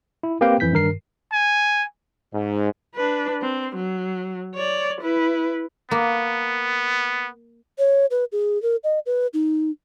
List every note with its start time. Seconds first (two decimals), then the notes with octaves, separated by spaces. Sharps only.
0.23 E4
0.41 A#3 C4 G4 B4 F5 G5
0.60 F2 E3 G6 B6
0.73 G2 D#3 A#4 C7
1.33 G#5
2.33 G#2
2.95 D4 B4
3.42 C4
3.76 F#3
4.55 C#5 D5
5.01 E4 B4
5.91 A#3 B3
7.79 C#5
8.11 B4
8.32 G#4
8.62 A#4
8.84 D#5
9.06 B4
9.34 D#4